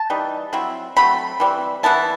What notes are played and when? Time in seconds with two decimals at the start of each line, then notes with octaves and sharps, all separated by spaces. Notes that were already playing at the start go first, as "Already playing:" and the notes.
Already playing: A5
0.10 E3 G3 D#4
0.53 F#3 C4 E4
0.97 F#3 A3 C4 B5
1.40 E3 G3 C4
1.83 E3 B3 E4 A5